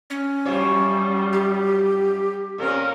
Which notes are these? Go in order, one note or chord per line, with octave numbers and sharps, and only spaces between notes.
C#4
F#2 F3 G3 C#5
G4
A#2 C4 C#4 A#4